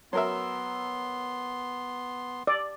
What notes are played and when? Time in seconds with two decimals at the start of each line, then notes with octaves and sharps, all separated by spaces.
0.13 F#3 B3 A#4 E5 C6
2.47 D5